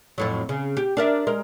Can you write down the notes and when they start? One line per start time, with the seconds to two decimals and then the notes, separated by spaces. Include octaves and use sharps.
0.18 F2 A2 F#3
0.49 C#3
0.77 G4
0.97 D4 A#4 E5
1.27 G#3 A#4